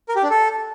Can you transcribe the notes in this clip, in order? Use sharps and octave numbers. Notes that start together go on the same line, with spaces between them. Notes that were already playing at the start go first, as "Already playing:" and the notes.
A#4
G4
D4
A4